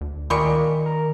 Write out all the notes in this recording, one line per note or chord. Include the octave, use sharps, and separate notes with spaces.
D2
A#2 D#3 G3 G#3 C#6
A#4